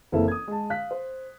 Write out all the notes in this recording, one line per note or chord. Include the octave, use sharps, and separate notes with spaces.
F#1 E3 A#3 C4 E4 A4
D#6 G#6
G#3 A5
F5 F#6 B6
C5